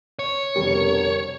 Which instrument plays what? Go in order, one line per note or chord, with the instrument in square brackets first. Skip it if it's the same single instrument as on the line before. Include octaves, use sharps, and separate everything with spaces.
[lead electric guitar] C#5
[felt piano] F1 G3 [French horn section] B2 D3 A#4